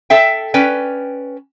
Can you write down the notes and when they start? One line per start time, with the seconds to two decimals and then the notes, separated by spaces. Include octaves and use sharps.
0.10 A4 E5 G5
0.54 C#4 B4 D5 G5